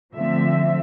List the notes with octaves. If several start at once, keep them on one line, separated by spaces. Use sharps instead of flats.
D3 F3 A3 C4 E5